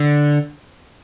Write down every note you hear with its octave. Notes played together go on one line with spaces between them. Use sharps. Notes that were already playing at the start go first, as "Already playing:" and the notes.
Already playing: D3